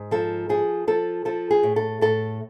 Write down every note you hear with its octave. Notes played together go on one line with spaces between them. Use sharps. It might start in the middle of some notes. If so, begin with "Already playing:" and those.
Already playing: G#2
F3 A4
F3 G#4
F3 A4
F3 A4
G#4
A2
A4
A2 A4